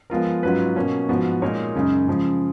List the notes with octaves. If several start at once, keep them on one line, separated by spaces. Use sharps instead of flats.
F3 G#3 B3 F4 A#4
G#2 F#3 C#4 F4 B4
B2 A#3 C#4
G#2 F3 B3 F#4
A#2 G#3 D#4 A#4 C#5
F#2 C#3 G#3 D#4
C#3 F3 G#3